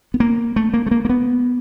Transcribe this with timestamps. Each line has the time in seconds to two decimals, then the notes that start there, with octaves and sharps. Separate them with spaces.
0.14 B3
0.20 A#3
0.56 A3
0.74 A#3
0.86 A3
0.91 A#3
1.05 A#3
1.09 B3